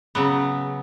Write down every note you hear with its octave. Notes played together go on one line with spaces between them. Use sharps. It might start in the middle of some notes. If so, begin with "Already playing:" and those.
C#3 F#3 B3